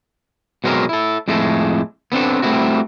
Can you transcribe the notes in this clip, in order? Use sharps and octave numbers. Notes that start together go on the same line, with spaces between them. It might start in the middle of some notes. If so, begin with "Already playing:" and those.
B2 F#3 G#3 C4 A#4
E4 A4
F2 A2 G#3 A3 A4
B3 C4 D4 A4
G3 A3 C4 D4 E4 F#4